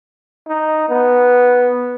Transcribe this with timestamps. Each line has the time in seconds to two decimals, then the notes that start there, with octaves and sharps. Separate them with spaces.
0.48 D#4
0.90 B3